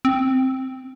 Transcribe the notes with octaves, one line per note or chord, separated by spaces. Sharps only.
C4